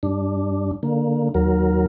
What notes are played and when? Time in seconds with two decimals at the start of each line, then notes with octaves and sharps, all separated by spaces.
0.03 G2 D4
0.83 D3 A#3
1.35 D#2 F#3 A#4